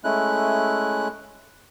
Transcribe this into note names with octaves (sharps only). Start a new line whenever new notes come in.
G#3 A3 C#4 E4 F#6